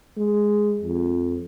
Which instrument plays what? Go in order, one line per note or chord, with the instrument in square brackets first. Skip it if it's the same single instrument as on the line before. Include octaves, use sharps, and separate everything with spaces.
[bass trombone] G#3
F2